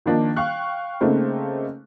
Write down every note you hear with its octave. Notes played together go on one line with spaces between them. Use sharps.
D#3 F3 A#3 D4 D#4
F5 G5 C#6 F#6
C#3 A3 A#3 C4 D#4